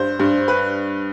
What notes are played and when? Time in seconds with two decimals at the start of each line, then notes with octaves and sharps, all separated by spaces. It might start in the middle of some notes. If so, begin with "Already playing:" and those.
Already playing: G2 C5
0.20 G2
0.48 B4